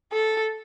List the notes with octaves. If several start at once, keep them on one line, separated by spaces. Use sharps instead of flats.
A4